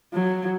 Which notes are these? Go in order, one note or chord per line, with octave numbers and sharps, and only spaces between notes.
F#3